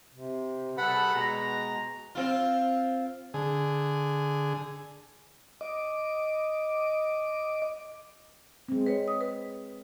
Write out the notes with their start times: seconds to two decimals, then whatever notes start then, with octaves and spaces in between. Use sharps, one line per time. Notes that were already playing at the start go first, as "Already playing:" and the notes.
0.14 C3
0.78 G3 G#4 A4 B4 F#5 B5
1.15 B2 G#3 A#5
2.15 C4 F4
3.34 D3 G#4
5.61 D#5 D6
8.68 G#3 C4
8.86 B4 C#5
9.08 D#6
9.21 B4